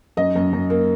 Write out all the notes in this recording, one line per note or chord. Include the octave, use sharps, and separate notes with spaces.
F#2 D#5
F#2
F#2
A#3